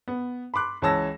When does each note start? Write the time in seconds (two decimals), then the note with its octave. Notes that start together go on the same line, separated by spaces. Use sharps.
0.08 B3
0.54 B5 C6 D6 F#6
0.82 C#2 E3 C#5 A5 E6 A#6